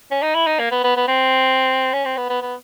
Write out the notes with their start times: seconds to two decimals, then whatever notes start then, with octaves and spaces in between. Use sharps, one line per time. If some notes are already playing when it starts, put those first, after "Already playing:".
0.11 C#4
0.23 D#4
0.35 E4
0.47 D#4
0.59 A#3
0.71 B3
0.84 B3
0.97 B3
1.08 C4
1.93 C#4
2.05 C4
2.17 B3
2.30 B3
2.42 B3